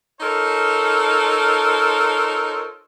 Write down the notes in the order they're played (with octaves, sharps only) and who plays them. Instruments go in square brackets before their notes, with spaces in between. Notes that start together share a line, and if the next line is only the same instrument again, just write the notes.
[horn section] D#4 F4 A4 A#4 C5 C#5